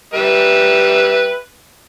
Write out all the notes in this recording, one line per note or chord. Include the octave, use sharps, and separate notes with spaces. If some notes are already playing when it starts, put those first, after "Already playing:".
G3 B4 E5